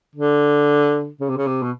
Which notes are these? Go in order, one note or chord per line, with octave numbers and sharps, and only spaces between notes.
D3
C#3
C3
C#3
C3
B2